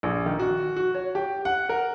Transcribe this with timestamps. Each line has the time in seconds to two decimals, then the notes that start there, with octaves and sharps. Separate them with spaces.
0.03 A#1
0.26 D#3
0.39 F#4
0.76 F#4
0.95 C#5
1.15 G4
1.45 F#5
1.69 A#4